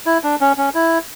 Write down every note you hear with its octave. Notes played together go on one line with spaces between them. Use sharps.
E4
D4
C#4
C#4
E4